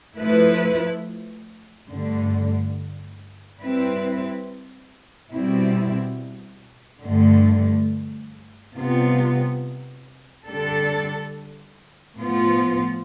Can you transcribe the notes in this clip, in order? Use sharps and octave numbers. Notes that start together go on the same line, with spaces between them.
F3 A3 E4 B4
G2 D3 A3
G3 C4 E4 B4
B2 G3 C4 E4
G2 D3 A3
C3 G3 B3 F4
D3 G3 D4 A4
A2 F3 B3 F4